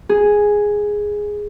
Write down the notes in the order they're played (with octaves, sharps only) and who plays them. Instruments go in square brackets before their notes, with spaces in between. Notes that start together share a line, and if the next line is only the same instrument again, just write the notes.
[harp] G#4